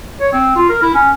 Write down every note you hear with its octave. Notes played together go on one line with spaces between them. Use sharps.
C#5
C4
F4
A#4
E4
C#4